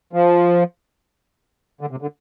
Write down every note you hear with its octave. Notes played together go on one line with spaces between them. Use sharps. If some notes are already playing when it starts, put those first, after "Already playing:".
F3
D3
C3
D3